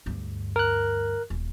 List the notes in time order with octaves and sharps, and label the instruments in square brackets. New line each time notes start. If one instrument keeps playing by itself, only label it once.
[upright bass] D2 G2
[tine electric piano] A#4 F#6
[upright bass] D#1